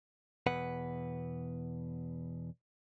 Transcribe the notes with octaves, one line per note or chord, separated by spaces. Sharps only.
E2 B2 B4 F#5